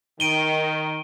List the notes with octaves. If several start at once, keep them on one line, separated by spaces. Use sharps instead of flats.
D#3 D7 D#7 G7